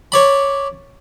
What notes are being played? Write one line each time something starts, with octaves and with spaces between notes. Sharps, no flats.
C#5 D5 B5